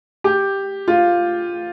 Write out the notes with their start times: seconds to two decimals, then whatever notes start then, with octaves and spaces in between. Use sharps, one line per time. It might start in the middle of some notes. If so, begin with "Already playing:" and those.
0.24 G4
0.88 F4